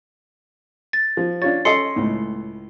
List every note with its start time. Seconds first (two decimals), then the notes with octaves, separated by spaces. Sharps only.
0.93 A6
1.17 F3
1.42 D4 F4 C#5 A6
1.65 C#4 A4 D#5 C6 C7 C#7
1.96 C#2 A2